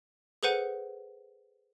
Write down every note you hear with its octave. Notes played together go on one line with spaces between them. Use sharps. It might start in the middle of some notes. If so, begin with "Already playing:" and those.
G#4 A4 B4 C5 F#5 D#7